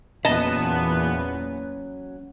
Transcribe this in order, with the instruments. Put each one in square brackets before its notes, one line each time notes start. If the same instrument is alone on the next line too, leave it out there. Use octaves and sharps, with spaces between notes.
[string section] E2 A#2 B3 [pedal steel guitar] F#3 C#4 B5 [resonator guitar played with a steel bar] D#5 A5